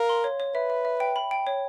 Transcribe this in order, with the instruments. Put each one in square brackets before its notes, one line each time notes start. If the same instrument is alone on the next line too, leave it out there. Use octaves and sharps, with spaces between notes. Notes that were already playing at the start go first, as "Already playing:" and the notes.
Already playing: [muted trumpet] A#4 [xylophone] F5
[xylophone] C6
C#5
C#5
[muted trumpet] B4 [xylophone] E5
[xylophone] E5
E5
G5
B5
G5
C#5